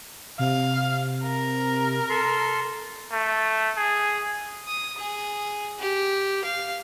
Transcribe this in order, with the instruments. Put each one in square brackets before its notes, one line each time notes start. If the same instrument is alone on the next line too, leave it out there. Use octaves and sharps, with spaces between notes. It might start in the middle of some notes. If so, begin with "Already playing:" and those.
[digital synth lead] C3 [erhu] F5
[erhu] A#4
[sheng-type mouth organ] A4 C6
[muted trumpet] A3
G#4
[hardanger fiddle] D#6
G#4
G4
F5